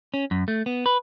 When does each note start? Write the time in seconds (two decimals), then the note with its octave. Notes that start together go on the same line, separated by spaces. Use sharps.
0.14 C#4
0.31 F#2
0.48 A3
0.66 B3
0.86 B4